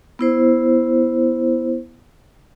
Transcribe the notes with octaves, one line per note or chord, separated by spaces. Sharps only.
B3 E4 C5